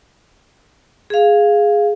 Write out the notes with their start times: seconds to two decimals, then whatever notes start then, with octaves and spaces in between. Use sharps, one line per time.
1.10 G#4 F5